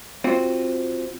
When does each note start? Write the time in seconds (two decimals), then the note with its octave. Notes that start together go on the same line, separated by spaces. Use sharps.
0.24 C4 F4 F#4